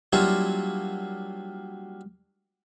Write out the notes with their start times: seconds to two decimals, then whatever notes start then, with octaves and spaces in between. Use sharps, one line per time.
0.13 F#3 G3 A#3 D4 E4 F4